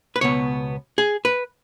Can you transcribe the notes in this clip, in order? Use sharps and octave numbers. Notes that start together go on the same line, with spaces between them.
B4
C#2 B2 B3 C#5
G#4
B4